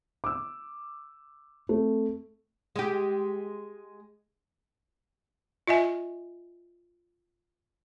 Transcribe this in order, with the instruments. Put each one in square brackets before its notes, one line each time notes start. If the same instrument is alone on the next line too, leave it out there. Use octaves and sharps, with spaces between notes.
[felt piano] D6 E6
A3 C4
[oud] G#3 G4
[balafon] F4 D#5 E5 G#5